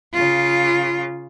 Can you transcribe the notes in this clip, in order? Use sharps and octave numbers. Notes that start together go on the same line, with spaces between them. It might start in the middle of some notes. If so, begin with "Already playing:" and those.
C#3 F4